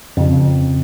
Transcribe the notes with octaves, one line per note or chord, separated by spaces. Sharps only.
F2 C#3